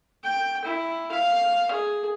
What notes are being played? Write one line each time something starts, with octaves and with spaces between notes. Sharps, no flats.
G5
E4
F5
G#4